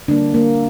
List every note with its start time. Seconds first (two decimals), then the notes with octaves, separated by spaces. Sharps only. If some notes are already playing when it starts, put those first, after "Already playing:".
0.08 D3 G3 A#3 D4
0.34 A#3